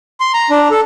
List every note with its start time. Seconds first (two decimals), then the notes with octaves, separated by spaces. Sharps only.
0.20 C6
0.34 A#5
0.50 D4
0.71 A4